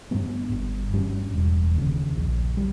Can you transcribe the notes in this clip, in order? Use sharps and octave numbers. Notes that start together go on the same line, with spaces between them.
G2 G3 B3
G1
G2 G3 C#4
E1
D#2 C#3
A#1
G3